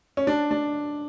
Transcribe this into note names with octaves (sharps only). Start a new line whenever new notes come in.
C#4
D4
D4